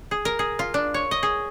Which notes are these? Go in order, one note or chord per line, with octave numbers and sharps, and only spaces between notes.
G#4
A#4
G#4
F4
D4
C#5
D#5
G#4